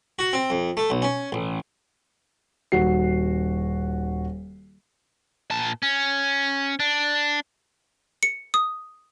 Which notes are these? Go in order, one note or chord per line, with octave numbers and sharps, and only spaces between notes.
F#4
C4
F2
A3
B1
C#4
A1
D#1 F#4 C7
A#2 A5
C#4
D4
C#7
D#6